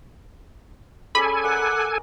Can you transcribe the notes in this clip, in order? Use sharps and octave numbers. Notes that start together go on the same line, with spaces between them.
C#4 G#4 A4 D5 G#5 B5
A#4 D5 F#5